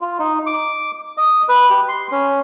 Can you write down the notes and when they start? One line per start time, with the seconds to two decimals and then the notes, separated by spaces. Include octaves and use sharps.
0.01 F4
0.19 D#4
0.46 D6
1.17 D#5
1.49 B4
1.70 G4
1.88 C6
2.12 C#4